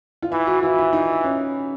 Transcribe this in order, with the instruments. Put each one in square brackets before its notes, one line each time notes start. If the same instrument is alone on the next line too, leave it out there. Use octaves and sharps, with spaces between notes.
[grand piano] F4
[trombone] E3 [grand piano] E4
[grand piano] F#4
[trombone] E3 [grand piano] F4
[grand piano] E4
D#4
C#4